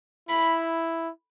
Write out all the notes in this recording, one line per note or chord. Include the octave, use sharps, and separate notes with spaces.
E4 B5